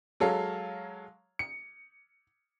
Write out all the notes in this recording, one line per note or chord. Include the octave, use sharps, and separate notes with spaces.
F#3 G#3 A4 C#5 F5
C#7